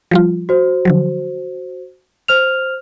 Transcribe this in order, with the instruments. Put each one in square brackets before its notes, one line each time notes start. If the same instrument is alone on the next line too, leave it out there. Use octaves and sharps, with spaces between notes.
[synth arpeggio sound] F3 G3 F4
[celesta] F#4 C5
[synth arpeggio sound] D3 F3 F#3
[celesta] C5 F6 F7